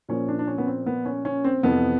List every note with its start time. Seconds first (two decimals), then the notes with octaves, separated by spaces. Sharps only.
0.09 A#2 F3 C#4
0.28 D4
0.39 D4
0.47 C#4
0.58 B3
0.67 C4
0.86 B3
1.05 C#4
1.25 C#4
1.44 C4
1.63 F2 C3 E3 B3